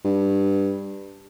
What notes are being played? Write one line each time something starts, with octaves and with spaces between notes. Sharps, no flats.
G2